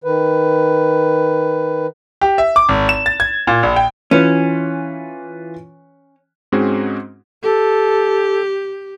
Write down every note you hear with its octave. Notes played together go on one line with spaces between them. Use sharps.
D#3 B4
G4
E5
D6
G#1
E7
A6
G#6
A#2
A#1
G5
E3 C#4 F4 B4
G#2 G#3 C4 C#4 F#4 G#4
G4 A4